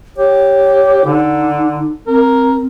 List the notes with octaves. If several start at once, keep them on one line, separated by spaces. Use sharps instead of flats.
G4 C#5
D3 D#4
C4 A#4